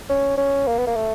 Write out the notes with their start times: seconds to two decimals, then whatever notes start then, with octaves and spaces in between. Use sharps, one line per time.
0.09 C#4
0.38 C#4
0.67 A#3
0.78 B3
0.87 A#3
0.95 A3